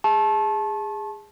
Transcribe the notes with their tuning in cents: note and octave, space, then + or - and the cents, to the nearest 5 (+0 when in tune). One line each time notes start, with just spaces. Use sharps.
G#4 -25 A5 -20 C#6 -40